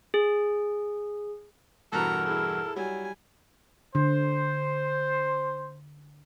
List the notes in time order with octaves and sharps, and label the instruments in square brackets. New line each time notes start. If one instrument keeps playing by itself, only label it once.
[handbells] G#4
[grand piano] E2 G2 B2 [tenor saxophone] A4 [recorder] A#4 [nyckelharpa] A#5
[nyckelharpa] E4 G#4 [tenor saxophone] A4
[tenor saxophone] F#3 [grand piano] G3 [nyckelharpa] G#5
[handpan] D3 [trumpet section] C5